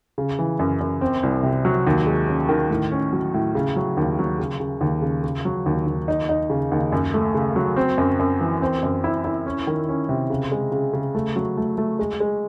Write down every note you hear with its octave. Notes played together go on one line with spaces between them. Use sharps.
C#3
E3
F#2
F#2
C4
C2
C3
F#3
D#2
G#3
C#4
D#3
A2
C#4
F#3
A2
C#3
F#3
D#2
F#3
C#3
C#3
D#2
C#3
C#3
F#3
D#2
D#2
D#4
D#4
C#3
D#2
F#2
A3
C#3
F#3
C4
F#2
F#2
E3
C4
F#2
E4
E4
C#4
D#3
C#4
C3
C#3
G#3
C#3
C#3
A3
F#3
A3
A3
G#3
G#3